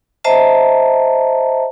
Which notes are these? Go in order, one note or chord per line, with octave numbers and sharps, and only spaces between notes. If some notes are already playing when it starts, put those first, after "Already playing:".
C5 D#5 E5 A5 A#5